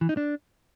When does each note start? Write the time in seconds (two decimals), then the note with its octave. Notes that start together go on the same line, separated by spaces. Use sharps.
0.01 E3
0.09 D#4
0.17 D4